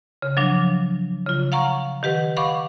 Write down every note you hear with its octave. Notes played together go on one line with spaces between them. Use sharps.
C#3
F3 F#3 D4
C#3 F4
F5 F#5 A#5 C#6
D#3 G4 B4 F#5
F5 F#5 B5 C#6 D6